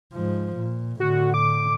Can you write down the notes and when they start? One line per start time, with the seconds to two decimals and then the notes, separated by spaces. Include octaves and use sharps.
0.13 G#2 F3
0.57 A#2
1.00 A2 D3 F#4
1.34 D6